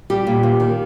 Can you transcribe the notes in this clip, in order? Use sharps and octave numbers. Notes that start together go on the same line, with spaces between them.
G3 G4
A#2
D#2
D#3